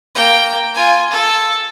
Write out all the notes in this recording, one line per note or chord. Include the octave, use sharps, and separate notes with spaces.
A#3 G5
F4 G#5
A4